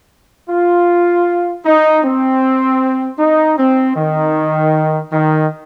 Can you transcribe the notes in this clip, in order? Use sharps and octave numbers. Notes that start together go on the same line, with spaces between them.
F4
D#4
C4
D#4
C4
D#3
D#3